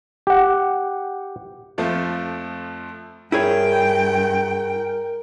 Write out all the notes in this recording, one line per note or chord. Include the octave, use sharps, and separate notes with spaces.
G4 F#5
F2 F3 A3
G2 E4 G#4 A#4 C#5 G5